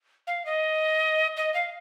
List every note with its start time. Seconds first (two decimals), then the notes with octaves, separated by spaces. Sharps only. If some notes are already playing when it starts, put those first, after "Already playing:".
0.27 F5
0.46 D#5
1.37 D#5
1.54 F5